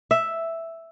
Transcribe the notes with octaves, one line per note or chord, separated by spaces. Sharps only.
E5